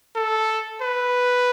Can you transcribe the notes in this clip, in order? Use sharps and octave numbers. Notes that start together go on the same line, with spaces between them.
A4
B4